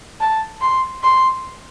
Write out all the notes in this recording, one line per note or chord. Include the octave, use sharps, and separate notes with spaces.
A5
C6
C6